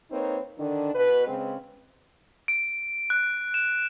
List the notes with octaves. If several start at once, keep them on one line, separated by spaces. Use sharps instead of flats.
A#3 C4 D#4 B4 C#5
D3 D#3 D4
B2 B4
C#3 G#3 C4
D7
F#6
E7